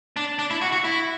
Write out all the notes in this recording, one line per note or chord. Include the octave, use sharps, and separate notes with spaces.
D4
D4
E4
F#4
F#4
E4